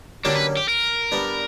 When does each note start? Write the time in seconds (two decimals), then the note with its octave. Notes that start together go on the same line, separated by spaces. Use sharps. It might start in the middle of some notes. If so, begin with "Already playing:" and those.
0.25 D3 F#3 A#3 C#4 D4 G4
0.35 B4
0.57 G4
0.69 A#4
1.12 G3 B3 D4